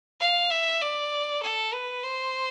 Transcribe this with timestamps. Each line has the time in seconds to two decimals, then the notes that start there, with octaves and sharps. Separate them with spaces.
0.20 F5
0.51 E5
0.81 D5
1.42 A4
1.73 B4
2.03 C5